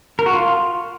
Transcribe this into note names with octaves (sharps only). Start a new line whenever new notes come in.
A#4
F#4
F4